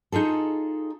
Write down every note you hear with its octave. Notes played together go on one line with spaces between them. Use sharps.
D#4 F4 G#4 A4